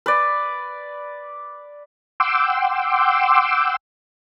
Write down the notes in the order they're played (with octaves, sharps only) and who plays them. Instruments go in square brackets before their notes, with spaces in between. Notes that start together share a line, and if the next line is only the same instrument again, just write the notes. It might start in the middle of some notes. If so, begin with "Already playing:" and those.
[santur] B4 D5
[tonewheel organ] F#5 G5 C6 D6 E6